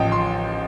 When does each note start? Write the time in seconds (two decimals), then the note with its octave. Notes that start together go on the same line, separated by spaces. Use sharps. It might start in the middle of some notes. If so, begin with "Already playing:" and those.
Already playing: A1 F3 D#5 G5 A5
0.12 C6